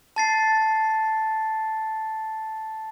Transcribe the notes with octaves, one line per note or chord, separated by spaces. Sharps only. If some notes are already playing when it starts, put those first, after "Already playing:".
A5 A6 C7